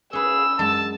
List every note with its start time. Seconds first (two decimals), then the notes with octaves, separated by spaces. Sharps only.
0.13 C#4 G#4 B4 E6
0.59 F#2 G#3 D5 A5